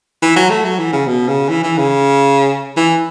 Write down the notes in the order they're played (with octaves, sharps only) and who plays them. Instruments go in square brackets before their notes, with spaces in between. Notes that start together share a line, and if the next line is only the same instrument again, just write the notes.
[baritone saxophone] E3
F#3
A3
F#3
E3
C#3
B2
C#3
E3
E3
C#3
E3